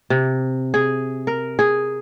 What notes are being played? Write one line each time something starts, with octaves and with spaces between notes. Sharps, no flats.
C3
G#4
A#4
G#4